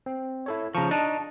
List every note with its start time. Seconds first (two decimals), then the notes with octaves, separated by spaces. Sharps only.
0.06 C4
0.46 E4 A4 C#5
0.75 C#3 F3 A5 A#5 C#6
0.91 D4 D#4 D#5 A5